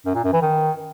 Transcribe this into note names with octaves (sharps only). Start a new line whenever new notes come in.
F#2
A#2
F#2
E3
D#3